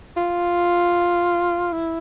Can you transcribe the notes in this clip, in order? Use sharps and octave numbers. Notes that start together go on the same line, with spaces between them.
F4
E4